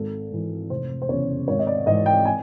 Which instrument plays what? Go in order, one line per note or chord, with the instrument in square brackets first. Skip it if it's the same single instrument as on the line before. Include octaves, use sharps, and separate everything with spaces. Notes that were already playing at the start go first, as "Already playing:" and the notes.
Already playing: [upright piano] G#1 A4
G#2 E3
F1 C5
C5
E2 C#3 C#5
G#1 C#5
D#5
D5
G#2 E3 D#5
G5
G#5